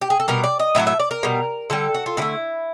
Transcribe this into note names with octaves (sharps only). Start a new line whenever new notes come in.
G4
G#4
A4
B2 G3 A#4
D5
D#5
A2 F#3 A3 E5
E5
D5
A#4
B2 G3
D3 G3 A4
F#4
F4
D3 F3 A3 E4